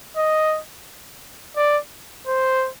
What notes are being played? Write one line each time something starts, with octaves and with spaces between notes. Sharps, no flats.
D#5
D5
C5